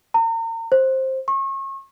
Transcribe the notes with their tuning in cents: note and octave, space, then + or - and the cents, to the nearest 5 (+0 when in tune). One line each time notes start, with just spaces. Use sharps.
A#5 -40
C5 +10
C#6 -35